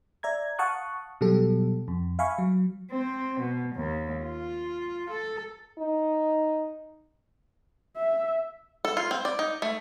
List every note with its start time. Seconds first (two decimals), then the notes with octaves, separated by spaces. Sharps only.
0.23 D5 E5 A#5 G#6
0.59 F5 F#5 A5 C#6 D#6 F#6
1.21 B2 F#3 G3 G4 A4
1.88 F2
2.19 E5 F5 G#5 B5 C#6
2.38 F#3
2.91 C4
3.40 B2
3.75 D#2
4.24 F4
5.10 A4
5.79 D#4
7.97 E5
8.85 A4
8.97 F4
9.11 C4
9.25 D5
9.39 D#4
9.62 A3